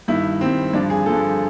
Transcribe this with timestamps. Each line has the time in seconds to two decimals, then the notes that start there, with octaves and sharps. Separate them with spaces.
0.08 G2 D#3 E4
0.41 G2 D#3 C4
0.73 G2 D3 F3 D4
0.90 G#4
1.06 G2 D3 F3 A4